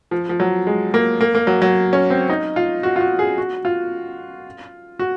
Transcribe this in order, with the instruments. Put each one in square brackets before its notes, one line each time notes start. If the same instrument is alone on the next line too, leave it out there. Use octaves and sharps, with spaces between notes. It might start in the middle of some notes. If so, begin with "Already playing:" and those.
[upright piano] F3
F3
F#3
G#3
A#3
A#3
A#3
F#3
F#3
C#4
C4
D#4
F4
F#4
F4
F#4
G#4
F#4
F4
F#4